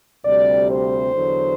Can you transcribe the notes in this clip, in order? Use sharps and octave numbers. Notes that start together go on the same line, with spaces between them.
D2 C3 G3 D5
C5
E2 D3 F#3